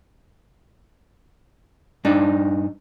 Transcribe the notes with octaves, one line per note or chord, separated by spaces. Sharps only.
G2 D4 D#4